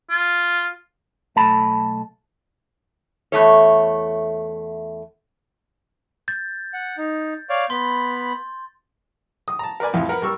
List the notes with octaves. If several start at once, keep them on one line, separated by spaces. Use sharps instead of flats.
F4
B1 A3 A4 A5 B5
E2 A3 C#5
G6 A6
F#5
D#4
C#5 D5 F5
B3 B5 C6
D#6
A5 A#5
A#4 B4 D5 G#5
C2 F2 A2
A#4 B4 F#5
G3 A#4 C#6 E6